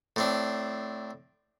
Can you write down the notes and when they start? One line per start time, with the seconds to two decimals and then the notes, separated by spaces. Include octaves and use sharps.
0.16 A2 C4 D4